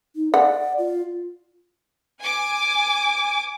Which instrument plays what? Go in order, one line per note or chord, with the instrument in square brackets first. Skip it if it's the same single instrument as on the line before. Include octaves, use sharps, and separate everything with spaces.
[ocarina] D#4
[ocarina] D5 [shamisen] F#5
[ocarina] F4
[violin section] G#5 D6